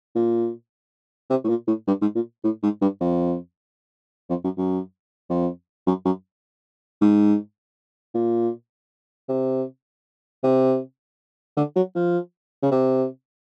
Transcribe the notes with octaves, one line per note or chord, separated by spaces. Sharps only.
A#2
C3
A2
A#2
A2
G2
G#2
A#2
A2
G#2
G2
F2
F2
F#2
F#2
F2
F#2
F#2
G#2
A#2
C3
C3
D3
F#3
F3
C#3
C3